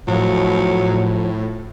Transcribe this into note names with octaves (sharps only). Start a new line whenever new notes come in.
A2 F3 F#3